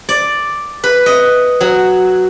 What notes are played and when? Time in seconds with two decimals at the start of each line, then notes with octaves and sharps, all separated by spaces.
0.09 D5
0.83 B4
1.06 D#5
1.61 F#3